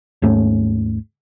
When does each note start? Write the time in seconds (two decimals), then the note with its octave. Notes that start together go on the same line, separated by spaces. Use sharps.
0.22 D#2 G#2 A3 C#4